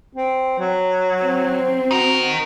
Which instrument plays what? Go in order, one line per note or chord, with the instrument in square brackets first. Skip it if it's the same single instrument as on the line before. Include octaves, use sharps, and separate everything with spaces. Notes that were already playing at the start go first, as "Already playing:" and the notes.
[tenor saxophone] C4
F#3
[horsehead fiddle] C4
[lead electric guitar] D#4 A#4 [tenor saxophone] F#4